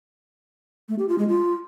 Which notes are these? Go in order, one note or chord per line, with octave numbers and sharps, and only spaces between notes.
A3
G4
F4
G#3
F4